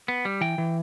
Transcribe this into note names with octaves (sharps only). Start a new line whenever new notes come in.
B3
G3
E3 G5
E3